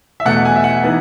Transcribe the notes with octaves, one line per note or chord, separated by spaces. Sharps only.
E5
E2 B2 A3 F#5
G#5
E5
F#5
E3 B3 D#4